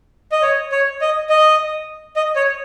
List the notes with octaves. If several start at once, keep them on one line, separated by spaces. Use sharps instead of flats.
D#5
C#5
C#5
D#5
D#5
D#5
C#5